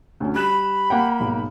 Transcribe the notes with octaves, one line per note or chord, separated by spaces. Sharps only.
D2 C#4
G3 B5 F#6 E7
A#3 F#5 G5
B1 G#2